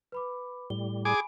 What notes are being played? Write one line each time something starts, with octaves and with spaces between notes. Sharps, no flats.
B4 B5 D6
A2 G3 G7
G#4 G#5 B5 D6 D7